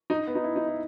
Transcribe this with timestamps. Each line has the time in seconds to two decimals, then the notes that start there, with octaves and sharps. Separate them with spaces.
0.10 D#4
0.27 B3
0.35 D#4
0.44 E4
0.56 D#4
0.67 E4